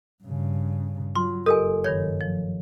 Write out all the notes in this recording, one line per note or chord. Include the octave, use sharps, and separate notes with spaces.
G2 C#3
F#3 F4 C6
F#1 G4 A4 A#4 D#5 G#5
G2 D#3 C#5 G#6
F3